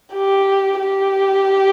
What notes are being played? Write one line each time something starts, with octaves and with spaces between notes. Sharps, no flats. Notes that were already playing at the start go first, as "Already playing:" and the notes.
G4
G4